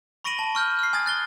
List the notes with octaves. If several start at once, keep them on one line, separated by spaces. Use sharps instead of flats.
B5 C#6 A#6 D7 D#7 F#7
A5
C#6 F6 G6
F6 C7
G#5 D#6 G#6 A6
F#6 A6 G7